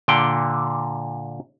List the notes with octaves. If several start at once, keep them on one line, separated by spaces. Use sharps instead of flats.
A#2 D3 G5